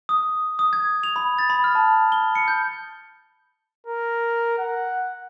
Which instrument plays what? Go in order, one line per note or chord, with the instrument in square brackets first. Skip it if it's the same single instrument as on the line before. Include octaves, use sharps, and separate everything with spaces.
[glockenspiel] D#6
D#6
G#6
F7
B5
A6
B5
F6
A5
G7
C#7
G6
[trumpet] A#4
F#5